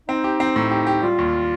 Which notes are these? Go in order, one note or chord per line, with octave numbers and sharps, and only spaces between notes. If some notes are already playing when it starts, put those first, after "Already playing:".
C4 D#4
G4
C4
A2
G4
G4
G3 F4
D#2